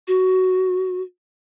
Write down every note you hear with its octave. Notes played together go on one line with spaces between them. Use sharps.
F#4